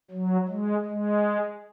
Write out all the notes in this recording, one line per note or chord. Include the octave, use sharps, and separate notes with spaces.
F#3
G#3
G#3